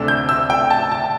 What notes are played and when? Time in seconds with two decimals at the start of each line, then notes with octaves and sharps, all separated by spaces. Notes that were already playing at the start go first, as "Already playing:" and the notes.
Already playing: D2 C3 A3 D4 E6
0.08 G6
0.29 E6
0.50 G5
0.70 A5
0.92 A5